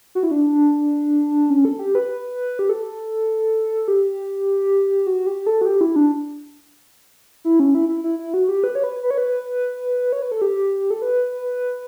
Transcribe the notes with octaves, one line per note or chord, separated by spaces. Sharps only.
F#4
E4
D4
C#4
A4
G4
B4
G4
A4
G4
F#4
G4
A4
F#4
G4
E4
D4
E4
C#4
E4
E4
E4
E4
F#4
G4
B4
C#5
B4
B4
C#5
B4
C#5
B4
A4
G4
A4
B4